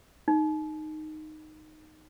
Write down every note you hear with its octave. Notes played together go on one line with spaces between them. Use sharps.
D#4